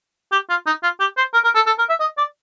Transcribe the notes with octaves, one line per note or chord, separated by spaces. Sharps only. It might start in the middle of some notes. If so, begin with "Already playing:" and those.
G4
F4
D#4
F4
G4
C5
A#4
A#4
A4
A4
A#4
E5
D#5
D5